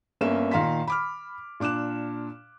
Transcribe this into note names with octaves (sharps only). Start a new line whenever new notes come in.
G1 A#3 C#4 E5 E7
A#2 D#3 F5 A#5 C6 B6
B5 D6 F6
A#2 D4 D6 F#6 E7